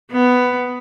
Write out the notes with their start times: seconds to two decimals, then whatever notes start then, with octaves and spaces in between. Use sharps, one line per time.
0.12 B3